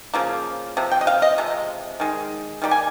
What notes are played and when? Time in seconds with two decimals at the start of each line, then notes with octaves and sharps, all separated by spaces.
0.14 C#3 F3 A#3
0.77 C3 F3
0.92 G5
1.01 D#5
1.07 F5
1.22 D#5
1.38 C3 F3 G#3
2.00 D#3 G#3
2.62 D#3 G3 A#3
2.71 G#5